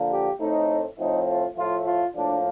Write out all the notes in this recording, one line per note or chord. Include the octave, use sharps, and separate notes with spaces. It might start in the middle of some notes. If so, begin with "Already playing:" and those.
Already playing: D3 F3 A#3
G4
A2 A3 C4 D#4
A2 F3 A3 C4 D#4
F4
A2 F3 A3 F4
F4
A2 F3 A#3 D4